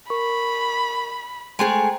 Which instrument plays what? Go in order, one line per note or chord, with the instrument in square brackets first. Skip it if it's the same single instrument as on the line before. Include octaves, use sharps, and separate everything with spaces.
[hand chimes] A#4 C#6 [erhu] B5
[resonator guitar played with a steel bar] G#3 A3 G#4 [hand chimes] C5 G5 A#5